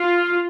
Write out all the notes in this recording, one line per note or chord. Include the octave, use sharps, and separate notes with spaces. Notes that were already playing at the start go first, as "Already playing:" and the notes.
Already playing: F4